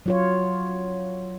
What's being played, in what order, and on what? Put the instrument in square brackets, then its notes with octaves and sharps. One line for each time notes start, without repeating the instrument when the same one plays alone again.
[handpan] F#3 F4 C#5